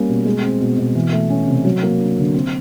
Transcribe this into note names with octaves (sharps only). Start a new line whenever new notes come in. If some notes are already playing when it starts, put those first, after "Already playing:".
Already playing: G3 A#3 C#4
B2
G#3
C4
B2
B2
E3
A3
C#4
C3
F#3
A#3
D4
D3
C4